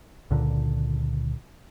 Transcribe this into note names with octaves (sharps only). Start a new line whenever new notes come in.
C#2 A#2 D3